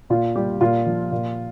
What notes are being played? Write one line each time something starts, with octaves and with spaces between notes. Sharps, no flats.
A#2 F4
G3 G4
A#2 F4
F3
A#2